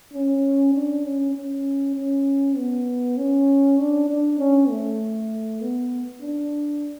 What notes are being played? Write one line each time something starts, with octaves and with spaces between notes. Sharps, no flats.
C#4
D4
C#4
C#4
C#4
B3
C#4
D4
D4
C#4
A3
B3
D4